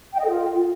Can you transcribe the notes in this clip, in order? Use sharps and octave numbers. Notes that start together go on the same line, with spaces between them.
G5
D#5
A4
F4